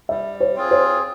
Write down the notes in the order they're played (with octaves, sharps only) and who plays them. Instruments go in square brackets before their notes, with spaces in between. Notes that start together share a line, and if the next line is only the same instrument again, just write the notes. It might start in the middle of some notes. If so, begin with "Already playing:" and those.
[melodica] G3 [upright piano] E5
[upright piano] C#5
[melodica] C4 F4 G#4
[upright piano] C#5